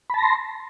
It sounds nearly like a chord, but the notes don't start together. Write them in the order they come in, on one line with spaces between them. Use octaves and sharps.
B5 A5 A#6 C6